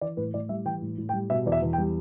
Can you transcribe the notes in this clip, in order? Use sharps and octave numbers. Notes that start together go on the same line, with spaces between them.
E3 D5
A2 B4
A2 D5
G3 E5
E3 G5
A2
A2
G5
G3
B2 E5
E2 D5
E5
E2
G5
G3